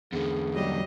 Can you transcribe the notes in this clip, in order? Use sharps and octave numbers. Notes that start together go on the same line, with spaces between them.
E2 D3 G#4
F#3 G3 D#5